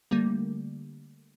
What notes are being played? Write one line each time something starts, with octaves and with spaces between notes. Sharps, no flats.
D3 G3 A3 A#3